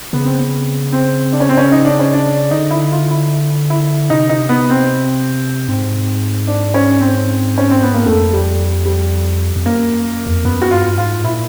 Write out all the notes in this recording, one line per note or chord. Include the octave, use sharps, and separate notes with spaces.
C#3 B3
C4
B3
C4
D4
C#4
C4
C#4
D#4
D4
C#4
D4
D3 D#4
E4
F4
E4
E4
C3 D#4
D#4
B3
C4
G#2 C4
D4
C#4
C4
C#4
C4
B3
A#3
F2 A3
G3
G3
F2
F#2 A#3
E2
F2
F#2 B3
F#4
G2 F4
G#2 F4
A#2 E4